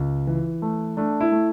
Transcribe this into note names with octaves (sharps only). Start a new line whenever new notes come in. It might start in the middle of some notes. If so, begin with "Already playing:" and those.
Already playing: C#2
E3
A3
A3 D4
E4
A3